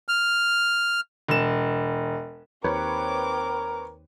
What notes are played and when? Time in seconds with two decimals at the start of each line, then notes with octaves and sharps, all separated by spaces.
0.08 F6
1.28 E1 E7
2.64 D#2 C4 A#4 B4 C#5 D6